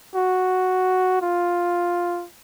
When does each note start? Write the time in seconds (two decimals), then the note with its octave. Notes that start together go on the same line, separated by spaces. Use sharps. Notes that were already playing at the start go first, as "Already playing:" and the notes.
0.15 F#4
1.22 F4